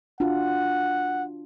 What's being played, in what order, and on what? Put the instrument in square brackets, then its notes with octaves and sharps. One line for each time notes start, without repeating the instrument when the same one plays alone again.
[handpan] D4 F4 F#4 [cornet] F#5